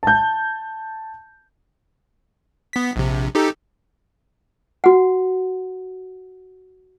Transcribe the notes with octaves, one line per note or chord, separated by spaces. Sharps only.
A5 G6
B3 B6
A#1 C3
D#4 G4 A4
F#4 F#5